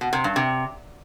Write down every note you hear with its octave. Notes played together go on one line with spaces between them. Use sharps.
B2
C3
G2
C3